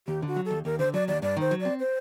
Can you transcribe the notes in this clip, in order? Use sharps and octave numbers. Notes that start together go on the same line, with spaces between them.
D#2 G4
D3 F#4
F#3
A4
D#2
D#2 A#4
D3 C5
F#3 D5
D#2 D5
G2 D5
D#3 C5
F#3
C4 D5
C5